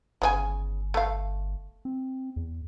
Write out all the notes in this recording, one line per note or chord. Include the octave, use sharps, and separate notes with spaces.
G1 C#3 C#4 G#5
A3 F5
C4
E2